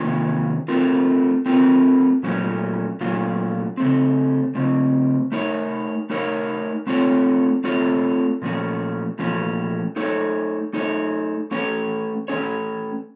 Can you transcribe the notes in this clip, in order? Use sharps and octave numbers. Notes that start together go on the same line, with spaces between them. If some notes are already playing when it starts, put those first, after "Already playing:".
Already playing: C3 D#3 A#3 C#4 F4
A3 C4 F4 A#4
A3 C4 F4 A#4
A#2 F#3 A3 C#4 F4
A#2 F#3 A3 C#4 F4
C#3 A3 C4
C#3 A3 C4
A3 D#4 A#4 C#5
A3 D#4 A#4 C#5
A3 C4 F4 A4 C#5
A3 C4 F4 A4 C#5
A#2 F3 A3 C#4
A#2 F3 A3 C#4
A3 D#4 A4 C#5
A3 D#4 A4 C#5
A3 C#4 A4 C#5
A3 C#4 A4 C#5